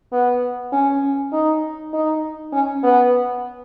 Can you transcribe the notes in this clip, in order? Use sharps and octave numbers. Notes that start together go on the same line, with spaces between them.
B3
C#4
D#4
D#4
C#4
B3